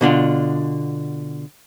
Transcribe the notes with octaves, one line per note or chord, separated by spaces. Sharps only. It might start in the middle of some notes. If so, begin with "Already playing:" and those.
B2 D3 D4 F4